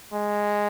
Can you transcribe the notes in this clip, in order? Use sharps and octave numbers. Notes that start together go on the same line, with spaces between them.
G#3